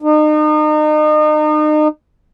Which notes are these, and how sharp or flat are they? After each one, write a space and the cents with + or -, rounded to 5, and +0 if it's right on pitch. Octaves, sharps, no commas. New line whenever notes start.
D#4 -35